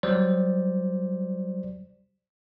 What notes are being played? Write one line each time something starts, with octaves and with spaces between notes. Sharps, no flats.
F#3 G3 C5 D5